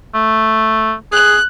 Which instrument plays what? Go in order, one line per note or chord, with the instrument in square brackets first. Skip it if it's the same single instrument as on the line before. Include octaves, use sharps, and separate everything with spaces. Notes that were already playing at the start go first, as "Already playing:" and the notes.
[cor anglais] A3
[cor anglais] G#4 [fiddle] F#6